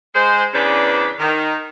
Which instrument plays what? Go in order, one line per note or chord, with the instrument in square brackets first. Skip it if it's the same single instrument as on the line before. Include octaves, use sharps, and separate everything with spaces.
[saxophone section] G#3 C5
E2 C#3 D4 B4 C5 D5
D#3